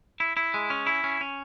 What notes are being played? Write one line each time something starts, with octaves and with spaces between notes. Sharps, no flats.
E4
E4
G#3
C#4
E4
C#4
C#4